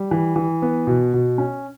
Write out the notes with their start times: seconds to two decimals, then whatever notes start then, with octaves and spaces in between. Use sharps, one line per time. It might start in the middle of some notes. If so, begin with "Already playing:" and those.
Already playing: G3
0.11 E3
0.36 E3
0.62 B3
0.87 B2
1.14 B2
1.38 C#4